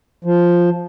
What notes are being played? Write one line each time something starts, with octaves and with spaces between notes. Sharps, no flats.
F3